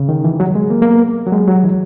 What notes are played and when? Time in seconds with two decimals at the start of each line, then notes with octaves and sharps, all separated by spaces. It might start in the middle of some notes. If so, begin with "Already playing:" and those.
Already playing: C#3
0.09 D#3
0.24 E3
0.40 F#3
0.55 G#3
0.70 A#3
0.82 A#3
0.86 B3
1.27 F#3
1.32 G#3
1.48 F#3
1.63 E3